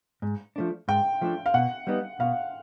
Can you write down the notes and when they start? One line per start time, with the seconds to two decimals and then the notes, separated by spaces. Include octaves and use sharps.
0.22 G#2
0.56 F3 A3 D4
0.88 G#2 G5
1.21 F3 A3 D4
1.46 F5
1.54 B2 F#5
1.87 G3 B3 D#4
2.20 B2 F5